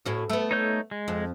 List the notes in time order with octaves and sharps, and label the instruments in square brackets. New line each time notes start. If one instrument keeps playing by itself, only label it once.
[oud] A2 C#4 F#4
A3 B3
[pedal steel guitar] D#4 C#5 G6
G#3
[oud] F2